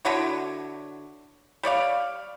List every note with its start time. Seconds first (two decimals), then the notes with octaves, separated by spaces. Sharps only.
0.05 D3 E4 F#4 C#5
1.63 G3 C#5 D5 F5